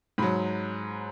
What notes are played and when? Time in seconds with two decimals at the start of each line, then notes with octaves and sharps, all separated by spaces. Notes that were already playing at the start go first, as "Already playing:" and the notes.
0.18 G#2 F#3 B5